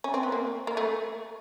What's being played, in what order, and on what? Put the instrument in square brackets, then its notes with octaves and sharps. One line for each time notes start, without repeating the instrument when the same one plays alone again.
[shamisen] C#4
C4
B3
A#3
A#3
A3